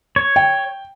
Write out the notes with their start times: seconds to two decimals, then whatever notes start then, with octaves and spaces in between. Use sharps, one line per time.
0.16 C#5
0.36 G5